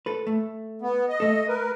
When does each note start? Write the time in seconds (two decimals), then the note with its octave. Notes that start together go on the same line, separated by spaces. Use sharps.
0.06 A4 B4
0.27 A3
0.82 B3
1.09 D#5
1.20 A3 A4
1.48 A#4 B4